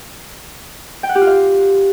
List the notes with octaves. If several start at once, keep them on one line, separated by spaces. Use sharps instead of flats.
G5
F#5
G4
F4
F5